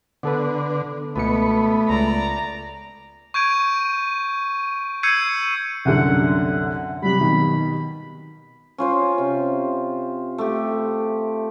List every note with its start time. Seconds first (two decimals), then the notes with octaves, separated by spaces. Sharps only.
0.23 D3 B3 A4 B4
1.16 C#2 B2 A3 B3 C#7
1.89 C#2 D5 A#5
3.34 C#6 G6 G#6 D7 D#7
5.03 E6 G6 G#6 C7 C#7 D#7
5.85 C2 F#2 D3 F#5
7.02 C3 F#3 G3 B5
7.21 B2 D#3
8.78 C#4 F4 C5
9.18 C3
10.38 A3 G4